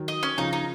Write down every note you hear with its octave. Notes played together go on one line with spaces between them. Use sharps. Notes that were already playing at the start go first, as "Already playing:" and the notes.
Already playing: D#3 F#3
D#5
C#4
C#3 F3 D#4
D#4